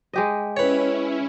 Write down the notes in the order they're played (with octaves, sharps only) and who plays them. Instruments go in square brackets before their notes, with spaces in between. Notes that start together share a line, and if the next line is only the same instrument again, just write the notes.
[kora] G#3 G4 D#5
[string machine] C#4 E4 [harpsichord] B4 C#5